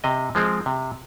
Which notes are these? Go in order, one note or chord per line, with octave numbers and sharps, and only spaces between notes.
C3 D#5
F3 G#3 C4
C3